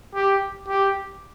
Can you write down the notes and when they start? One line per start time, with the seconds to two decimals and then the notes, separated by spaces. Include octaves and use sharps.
0.15 G4
0.67 G4